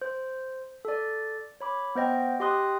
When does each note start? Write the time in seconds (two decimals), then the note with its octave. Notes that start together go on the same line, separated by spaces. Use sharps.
0.02 C5
0.85 A4 D5
1.61 C#5 B5 D6
1.95 B3 C5 D#5 G5
2.40 G4 D#5 G5 C6 D#6 F#6